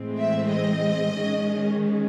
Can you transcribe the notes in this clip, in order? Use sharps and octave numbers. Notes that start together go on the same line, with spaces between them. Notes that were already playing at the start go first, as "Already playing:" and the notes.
Already playing: A2 E3 G#3 C4
E5
D#5
D#3 G#3 C#4